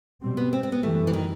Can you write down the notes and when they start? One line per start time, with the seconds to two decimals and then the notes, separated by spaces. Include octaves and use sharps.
0.22 B2 G3 C4
0.37 B3
0.53 C4
0.63 C4
0.72 B3
0.83 F#2 E3 G3 A3
1.07 E3
1.13 D#3